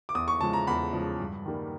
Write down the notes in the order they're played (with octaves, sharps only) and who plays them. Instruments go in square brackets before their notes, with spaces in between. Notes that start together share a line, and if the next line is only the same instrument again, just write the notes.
[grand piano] D6
E2 D#6
C#6
C#3 F3 G#3 A5
A#5
E2 B5
C#3 F3 G#3
G2
D#3 G3 A#3